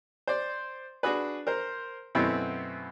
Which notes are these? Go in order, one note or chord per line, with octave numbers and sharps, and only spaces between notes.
C5 D5
D4 F#4 G#4 B4
A#4 C5
F#2 B2 A3 B3 C4 E4